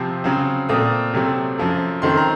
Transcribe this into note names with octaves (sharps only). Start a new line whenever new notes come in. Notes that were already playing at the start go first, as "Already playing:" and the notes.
Already playing: C3 F3 C4
C#3 F#3 C4
A#2 A3 C4 D#6
C3 F#3 A3 C4
F#2 F3 A3
F#2 D#3 A3 C4 C6
A#5